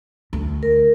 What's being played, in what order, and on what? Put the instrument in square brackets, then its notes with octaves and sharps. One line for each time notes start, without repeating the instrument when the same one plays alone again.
[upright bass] D2
[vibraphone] A#4